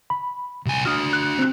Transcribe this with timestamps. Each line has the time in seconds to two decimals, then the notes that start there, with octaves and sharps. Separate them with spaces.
0.10 B5
0.66 C2 G#5
0.85 D4 F#4 D#6 F6
1.13 F#6
1.39 C4 F#6